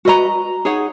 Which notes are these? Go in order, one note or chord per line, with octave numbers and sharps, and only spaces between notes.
F#4 B4 D#5 A#5
D#4 G#4 C#5 F#5